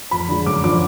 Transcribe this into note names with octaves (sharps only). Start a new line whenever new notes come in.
F2 B5
D3 G#3
F#2 D6
D3 F3 D6